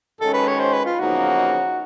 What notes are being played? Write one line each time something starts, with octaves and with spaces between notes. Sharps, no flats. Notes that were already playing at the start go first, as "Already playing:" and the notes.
F#2 D#3 G#3 C#4 A4
B4
C#5
C5
B4
F4
E2 C#3 F3 A#3 D#4 F#4